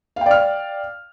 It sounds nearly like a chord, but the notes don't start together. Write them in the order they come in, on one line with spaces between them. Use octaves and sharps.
F5 G5 D5 F6